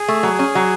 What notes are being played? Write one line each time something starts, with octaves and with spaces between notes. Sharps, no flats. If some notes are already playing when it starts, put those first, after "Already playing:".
Already playing: G#4
A3
F#3
C#4
F#3